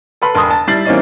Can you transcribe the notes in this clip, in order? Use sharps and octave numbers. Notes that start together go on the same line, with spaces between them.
A4 B4 B5 C6
E1 A5 C6 D#6
A5
G3 E4 A6 C7 F#7
E3 G3 A#3 C4 C#4 D#4